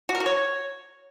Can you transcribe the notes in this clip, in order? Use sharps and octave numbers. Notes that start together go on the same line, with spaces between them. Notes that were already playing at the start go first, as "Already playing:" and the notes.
F#4
A#4
F#4
C#5